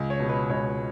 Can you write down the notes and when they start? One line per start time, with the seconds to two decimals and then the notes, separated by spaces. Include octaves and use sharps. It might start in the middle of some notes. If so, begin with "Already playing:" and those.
Already playing: C#2
0.10 C#5
0.20 B2 G#3
0.29 B4
0.50 C#2 C#5